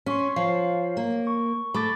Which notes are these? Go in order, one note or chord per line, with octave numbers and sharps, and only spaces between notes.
C#4 C6 C#6 B6
F3 C#5 F5
A#3
C#6
A3 B5 D6 A6